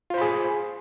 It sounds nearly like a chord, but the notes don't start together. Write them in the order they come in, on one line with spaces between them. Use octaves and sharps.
F4 C5 B5 G#4